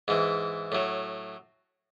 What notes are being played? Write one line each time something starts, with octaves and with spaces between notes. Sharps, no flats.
G#2 E3
A2 F#3